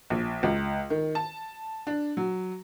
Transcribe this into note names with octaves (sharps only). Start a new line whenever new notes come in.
A#1
C#2
D#3
A5
D4
F#3